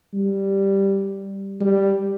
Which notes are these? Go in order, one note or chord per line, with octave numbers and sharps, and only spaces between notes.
G3
G3